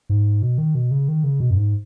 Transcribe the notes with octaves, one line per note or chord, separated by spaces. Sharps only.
G#2
B2
D#3
B2
C#3
D#3
C#3
B2
F#2
G#2